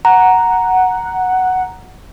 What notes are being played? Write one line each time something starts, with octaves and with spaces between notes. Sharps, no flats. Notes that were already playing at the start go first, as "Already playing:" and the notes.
F#5 A#5